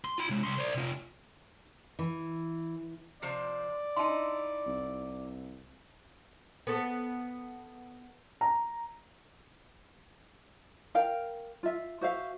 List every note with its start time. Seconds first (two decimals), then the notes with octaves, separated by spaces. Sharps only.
0.05 C6
0.18 F4 B5
0.30 C3 G#3
0.43 C2 C6
0.58 C5 D5
0.75 C3 F4
1.99 E3
3.22 C3 F3 C5 D5
3.96 D#4 E4 A5 C6
4.66 C2
6.67 B3 A4
8.41 A#5
10.95 A#4 F5 G5
11.63 F4 E5
12.01 F#4 C5 E5 F5